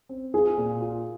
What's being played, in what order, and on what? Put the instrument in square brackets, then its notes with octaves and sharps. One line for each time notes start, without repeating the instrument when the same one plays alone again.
[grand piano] C4
[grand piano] F4 [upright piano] G#4
[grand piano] A#2
F4